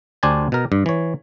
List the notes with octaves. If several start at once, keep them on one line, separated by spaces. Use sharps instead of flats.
D2 D4 G4 C5 G#5 A5
B2 A#4
G2
E3 C#5